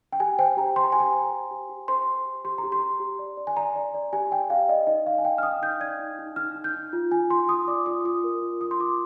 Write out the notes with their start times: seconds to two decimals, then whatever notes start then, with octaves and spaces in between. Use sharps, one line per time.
0.13 G5
0.20 G4 G#5
0.39 C5 G5
0.57 G4 A#5
0.76 C5 C6
0.84 A#5
0.92 G#5
0.95 G4 A#5
1.14 C5
1.32 G4
1.51 G4
1.69 G4
1.88 C5 C6
2.07 C5
2.26 G4
2.45 G4 C6
2.58 A#5
2.63 G4
2.72 C6
2.81 G4
3.00 G4
3.19 D5
3.37 D5
3.47 G#5
3.57 D5 A#5
3.76 D5
3.95 D5
4.13 G4 G#5
4.31 D5 G5
4.50 G4 F5
4.69 D5 D#5
4.87 D#4 D#5
5.06 D#4 F5
5.18 G#5
5.25 D5 G5
5.38 F6
5.43 D#4 D#6
5.62 D#4 G6
5.80 D5 G#6
6.00 D#4
6.19 D#4
6.36 D#4 F6
6.55 D#4
6.64 G6
6.75 D#4
6.93 F4
7.12 F4 G#5
7.30 F4 C6
7.49 F4 D#6
7.68 D5 D6
7.86 F4 D#6
8.05 F4 D#6
8.24 A#4
8.42 F4
8.61 F4 D#6
8.71 C6
8.80 F4 D6